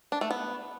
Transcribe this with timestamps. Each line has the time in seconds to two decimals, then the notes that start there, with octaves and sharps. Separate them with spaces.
0.12 D4
0.21 A3
0.30 B3